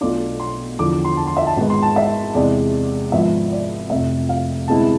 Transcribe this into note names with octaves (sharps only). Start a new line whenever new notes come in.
B1 B2 A3 D4 F4 D6
C6
E2 D3 F3 D6
D6
C6
A5
C6
E5
A5
G#1 G#2 G#3 B3
C6
A5
E5
E2 C3 G#3 D5
G#1 G#2 F3 B3 E5
D5
F1 F2 C3 E5
F5
D2 C3 G#3 B3 E4 A5